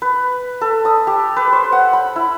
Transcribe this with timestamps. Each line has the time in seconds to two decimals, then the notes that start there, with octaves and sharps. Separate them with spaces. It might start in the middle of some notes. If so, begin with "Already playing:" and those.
0.02 B4
0.61 A4
0.85 D#6
1.07 G4
1.36 B4
1.52 C5
1.72 F#5
1.93 B5
2.16 E4